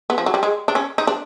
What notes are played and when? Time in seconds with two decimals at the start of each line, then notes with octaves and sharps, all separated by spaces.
0.10 B3
0.18 F3
0.26 F#3
0.34 G3
0.43 G#3
0.68 D4
0.75 C#4
0.98 D#4
1.07 D4